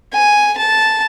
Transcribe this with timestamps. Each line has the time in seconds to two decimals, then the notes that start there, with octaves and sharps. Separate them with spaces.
0.13 G#5
0.57 A5